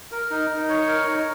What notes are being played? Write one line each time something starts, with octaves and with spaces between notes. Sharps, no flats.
A#4
D#4
D#4
C#5
A#4
D#4